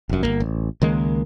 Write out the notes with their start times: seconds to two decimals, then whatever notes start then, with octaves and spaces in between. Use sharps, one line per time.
0.09 F1 F#2
0.23 G1 D#2 A#3
0.40 A1
0.82 C#2 D#3 G#3 A#3